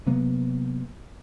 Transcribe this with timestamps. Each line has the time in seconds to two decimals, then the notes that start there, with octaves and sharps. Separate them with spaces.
0.06 C3 F#3 A#3 B3